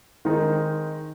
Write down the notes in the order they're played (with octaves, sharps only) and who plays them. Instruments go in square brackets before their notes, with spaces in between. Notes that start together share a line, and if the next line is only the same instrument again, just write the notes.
[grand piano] D#3 G#3 C4 D#4